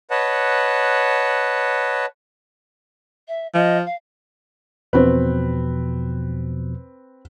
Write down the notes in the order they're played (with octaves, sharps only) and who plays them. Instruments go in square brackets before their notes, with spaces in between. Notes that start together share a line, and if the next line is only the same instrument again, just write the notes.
[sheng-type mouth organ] B4 C#5 D#5 F#5 A5
[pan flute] E5
[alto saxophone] F3 [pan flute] D#5
[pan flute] F5
[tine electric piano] E2 B2 F3 [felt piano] C4 B4